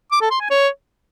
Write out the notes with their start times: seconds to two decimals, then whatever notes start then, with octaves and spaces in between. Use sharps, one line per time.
0.11 D6
0.21 A4
0.31 C6
0.40 G#5
0.50 C#5